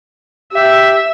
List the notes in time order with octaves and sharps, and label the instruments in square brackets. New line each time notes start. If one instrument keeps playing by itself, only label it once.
[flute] G4 [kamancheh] E5